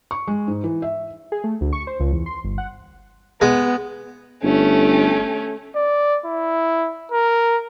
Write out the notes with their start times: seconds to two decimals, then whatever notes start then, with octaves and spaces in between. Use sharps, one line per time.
0.11 C#6
0.27 G#3
0.47 G#2
0.64 E3
0.82 E5
1.32 G#4
1.44 A3
1.61 D2
1.73 C#6
1.87 C5
2.00 C#2
2.12 E2
2.26 C6
2.44 G1
2.58 F#5
3.41 G#3 B3
4.43 G1 A3 C#4
5.75 D5
6.25 E4
7.11 A#4